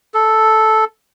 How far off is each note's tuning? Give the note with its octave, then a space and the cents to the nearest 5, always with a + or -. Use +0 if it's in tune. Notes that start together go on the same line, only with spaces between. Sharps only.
A4 -5